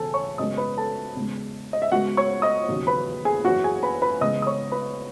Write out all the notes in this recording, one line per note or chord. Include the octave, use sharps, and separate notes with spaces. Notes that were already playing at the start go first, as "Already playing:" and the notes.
Already playing: E1 E2 C#3 A4 G#5 A5
C#5 C#6
F#2 C#3 G#3 B3 D#5 D#6
B4 B5
A4 A5
E2 C#3 G#3
D#5
E5
C#2 C#3 G#3 B3 F#4 F#5
C#5 C#6
D#5 D#6
E1 D#2 C#3 F#3
B4 B5
G#4 G#5
F#1 F#2 E3 F#4 F#5
G#4 G#5
B4 B5
B4 B5
C#2 C#3 E3 G#3 B3 D#5 D#6
D#6
C#5 C#6
B4 B5